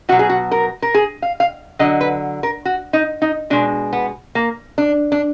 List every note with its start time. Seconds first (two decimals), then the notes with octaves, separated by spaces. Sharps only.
0.09 B2 F#3 F#4
0.19 G#4
0.30 F#4
0.52 A#4
0.82 A#4
0.94 G#4
1.22 F5
1.40 F5
1.79 D3 F#3 D#5
2.01 B4
2.43 A#4
2.65 F#4
2.93 D#4
3.22 D#4
3.50 B2 G#3 D4
3.93 B3
4.35 A#3
4.78 D4
5.12 D4